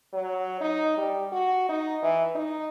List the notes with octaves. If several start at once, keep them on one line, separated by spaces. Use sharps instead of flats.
F#3
D#4
G3
F#4
D#4
E3
D#4